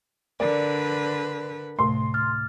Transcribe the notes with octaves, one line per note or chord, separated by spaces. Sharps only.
D3 A#4 B4 D5
D2 A2 C3 A3 C6
D6 F6 A6